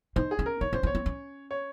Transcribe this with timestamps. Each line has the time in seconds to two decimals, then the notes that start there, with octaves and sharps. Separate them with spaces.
0.16 D#4 C5
0.31 G#4
0.39 C#4
0.46 A#4
0.61 D#4 C#5
0.73 C#4 C5
0.83 C4
0.87 C#5
0.95 C4
1.06 C#4
1.51 C#5